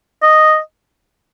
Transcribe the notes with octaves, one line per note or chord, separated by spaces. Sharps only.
D#5